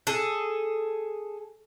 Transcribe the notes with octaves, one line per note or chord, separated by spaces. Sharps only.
G#4 A4